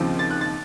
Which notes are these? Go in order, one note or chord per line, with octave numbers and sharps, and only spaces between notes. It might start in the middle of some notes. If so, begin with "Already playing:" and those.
Already playing: D#2 C#3 F3 C4
A6
F#6
A6